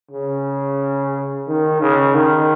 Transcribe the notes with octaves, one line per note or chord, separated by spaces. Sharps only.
C#3
D#3
C#3
D#3